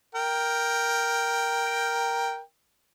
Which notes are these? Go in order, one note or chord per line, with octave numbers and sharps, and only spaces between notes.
A#4 G5